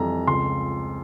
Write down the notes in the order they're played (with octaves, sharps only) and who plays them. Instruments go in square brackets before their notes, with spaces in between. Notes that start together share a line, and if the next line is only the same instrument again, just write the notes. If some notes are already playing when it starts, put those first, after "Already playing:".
Already playing: [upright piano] F2 E3 G3 A#5
C#2 C6